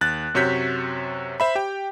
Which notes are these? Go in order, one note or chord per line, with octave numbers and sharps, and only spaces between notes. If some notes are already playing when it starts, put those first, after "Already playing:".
D#2 F#6 A6
F#2 C3 F#4 C#5 G6 B6
C5 E5 B5
G4 G5